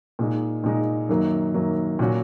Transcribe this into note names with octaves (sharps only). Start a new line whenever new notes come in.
A#2 G#3 D#4
A#2 G#3 D#4
F#2 D#3 F#3 A#3
F#2 D#3 F#3 A#3
A#2 F#3 C#4 F#4